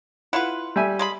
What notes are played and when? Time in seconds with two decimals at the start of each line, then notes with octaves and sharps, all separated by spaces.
0.33 E4 F4 B4 F#5
0.76 G3 E5 G#5
0.99 G#3 G#4 B5